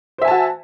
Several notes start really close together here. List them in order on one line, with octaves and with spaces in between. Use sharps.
C5 E5 G#5 A5 F#4